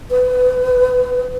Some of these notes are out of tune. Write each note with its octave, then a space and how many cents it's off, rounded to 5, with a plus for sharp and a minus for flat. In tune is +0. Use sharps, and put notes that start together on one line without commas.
B4 +30